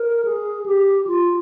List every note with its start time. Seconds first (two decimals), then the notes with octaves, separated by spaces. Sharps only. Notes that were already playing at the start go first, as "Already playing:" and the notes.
Already playing: A#4
0.25 G#4
0.66 G4
1.07 F4